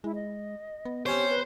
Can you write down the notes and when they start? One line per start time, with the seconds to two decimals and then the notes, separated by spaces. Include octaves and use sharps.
0.04 G#3 E4
0.15 D#5
0.85 B3
1.06 C4 C#4 G4 C5 C#5
1.30 B4